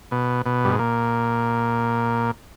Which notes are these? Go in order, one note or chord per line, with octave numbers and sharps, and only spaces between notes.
B2
B2
G2
G#2
A#2